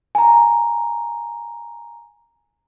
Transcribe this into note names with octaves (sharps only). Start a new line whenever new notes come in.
G#5 A#5